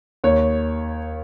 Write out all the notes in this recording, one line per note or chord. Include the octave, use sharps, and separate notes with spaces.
D#2 C#5